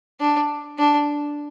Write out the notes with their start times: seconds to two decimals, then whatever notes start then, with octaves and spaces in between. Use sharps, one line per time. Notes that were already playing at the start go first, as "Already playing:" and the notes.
0.20 D4
0.78 D4